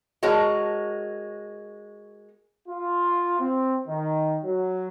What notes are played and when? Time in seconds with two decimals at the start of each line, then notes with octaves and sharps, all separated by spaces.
0.23 G#3 F#4 A#4 C#5 A5
2.68 F4
3.39 C4
3.86 D#3
4.43 F#3